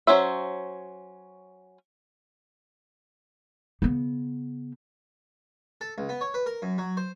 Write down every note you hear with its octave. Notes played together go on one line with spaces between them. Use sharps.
F#3 C#4 C5 E5
C#3 B3
A4
C#2
B3
C#5
B4
A#4
F#2
F#3
C5